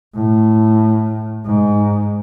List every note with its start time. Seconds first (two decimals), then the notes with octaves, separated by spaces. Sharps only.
0.15 A2
1.45 G#2